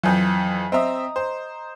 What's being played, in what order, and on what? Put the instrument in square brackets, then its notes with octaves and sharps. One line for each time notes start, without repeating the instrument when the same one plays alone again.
[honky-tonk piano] F2 E3 [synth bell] F#3 G#5 G6
[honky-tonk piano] C4 E5 [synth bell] D#5 A#5 D#6
[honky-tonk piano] C5